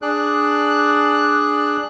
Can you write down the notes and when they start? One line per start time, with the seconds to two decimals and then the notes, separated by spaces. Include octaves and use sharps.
0.02 D4 G#4 D5 F#6